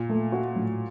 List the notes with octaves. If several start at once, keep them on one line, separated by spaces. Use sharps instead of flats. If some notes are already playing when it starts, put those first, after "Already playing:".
Already playing: A#2
A3
F#4
A2